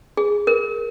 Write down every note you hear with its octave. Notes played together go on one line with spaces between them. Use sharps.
G#4
A#4